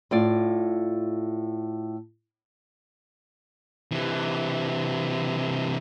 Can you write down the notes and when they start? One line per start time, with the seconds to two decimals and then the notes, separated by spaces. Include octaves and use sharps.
0.11 A2 F4 D5
3.91 C3 E3